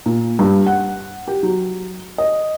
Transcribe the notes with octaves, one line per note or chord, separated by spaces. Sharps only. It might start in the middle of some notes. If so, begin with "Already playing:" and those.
A#2
G2
F#5
G4
F#3
D#5